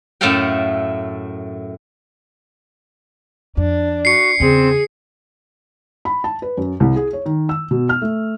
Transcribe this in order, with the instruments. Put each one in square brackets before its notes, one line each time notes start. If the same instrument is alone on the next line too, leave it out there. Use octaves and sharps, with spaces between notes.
[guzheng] F#2 A2 A3 A4 F5 G5
[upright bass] F2 [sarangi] D4
[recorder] F#4 [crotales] C7 C#7
[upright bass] E2 C#3 [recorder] C4 [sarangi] G#4
[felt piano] B5
A5
B4
F#2
C2
G#4
C#5
D#3
E6
B2
F6
A3